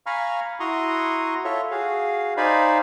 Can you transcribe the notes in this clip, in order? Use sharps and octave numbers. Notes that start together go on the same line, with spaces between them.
F5 G#5 A#5 B5 C#6 F6
E4 F#4 A#5 C6 C#6 D#6
F4 A4 C#5 E5 C#6
F#4 G#4 F5
D#4 C5 D5 F5 G#5 B5